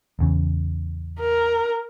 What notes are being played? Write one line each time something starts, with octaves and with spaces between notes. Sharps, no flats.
A1 E2 C#3
A#4